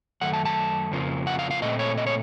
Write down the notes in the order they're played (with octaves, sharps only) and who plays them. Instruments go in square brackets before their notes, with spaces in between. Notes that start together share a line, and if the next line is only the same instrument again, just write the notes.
[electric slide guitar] F#2 D#3 A3 F#5
A5
A5
F2 C#3 F3 A#3 F4
F#5
F5
F5
A#2 A3 C4 D#5
C#5
D#5
C#5